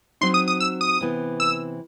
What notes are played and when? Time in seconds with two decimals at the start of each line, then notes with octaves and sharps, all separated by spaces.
0.21 F#3 C4 D#4 C6
0.34 D#6
0.48 D#6
0.60 E6
0.81 D#6
1.01 C3 E3 B3
1.40 E6